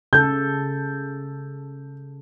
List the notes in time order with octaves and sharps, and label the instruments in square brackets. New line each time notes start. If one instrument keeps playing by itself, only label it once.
[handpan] C#3 A4 [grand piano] G6